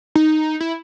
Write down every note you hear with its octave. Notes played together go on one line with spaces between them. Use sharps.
D#4
E4